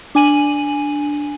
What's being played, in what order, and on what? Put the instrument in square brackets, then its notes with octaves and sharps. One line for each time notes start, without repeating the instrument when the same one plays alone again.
[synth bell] D4 G#5 D#7 F#7